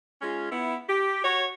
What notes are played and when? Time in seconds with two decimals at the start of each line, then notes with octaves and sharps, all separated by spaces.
0.22 G#3 C#4 F4
0.50 B3 E4
0.88 G4
1.23 F#4 C#5